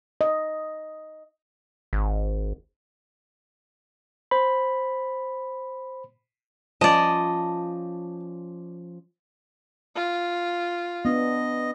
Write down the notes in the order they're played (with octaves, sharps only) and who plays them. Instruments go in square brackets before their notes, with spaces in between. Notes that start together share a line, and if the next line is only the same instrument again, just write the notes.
[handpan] D#5
[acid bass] G#1
[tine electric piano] C5 B5
[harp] F3 C#4 [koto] D5 D#5 [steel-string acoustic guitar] A5
[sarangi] F4
[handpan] B3 D4 [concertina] D#5